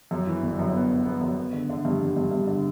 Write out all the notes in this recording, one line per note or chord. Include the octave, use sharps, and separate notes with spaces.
F#2
E3
G1
F#2
B3
B3
B3
F#2
B3
D3
D3
G2
G2
G2
G2
D3